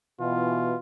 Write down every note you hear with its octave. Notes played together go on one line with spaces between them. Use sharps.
B2 E3 F4